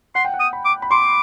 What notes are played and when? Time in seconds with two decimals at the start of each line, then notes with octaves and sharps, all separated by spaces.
0.15 F#5 C6
0.25 G5
0.34 F#5
0.40 D#6
0.53 B5
0.65 D6
0.82 B5
0.91 C6 D6